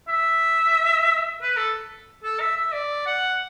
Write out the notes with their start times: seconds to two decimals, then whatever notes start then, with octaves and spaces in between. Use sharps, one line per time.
0.08 E5
1.41 B4
1.57 A4
2.24 A4
2.40 E5
2.56 E5
2.73 D5
3.06 F#5